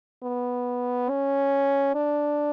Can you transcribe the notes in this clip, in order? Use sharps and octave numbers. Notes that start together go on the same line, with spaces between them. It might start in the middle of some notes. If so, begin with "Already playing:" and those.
B3
C#4
D4